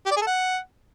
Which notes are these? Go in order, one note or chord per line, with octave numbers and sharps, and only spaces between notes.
G4
D5
G#4
A4
F#5